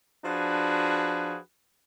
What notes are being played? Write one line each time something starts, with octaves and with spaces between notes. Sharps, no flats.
F3 D4 F#4 G#4 B4